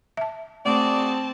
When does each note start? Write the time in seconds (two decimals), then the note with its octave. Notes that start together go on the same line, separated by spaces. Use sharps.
0.17 E5 A5
0.66 A3 C4 F#4 G#4 D5 A5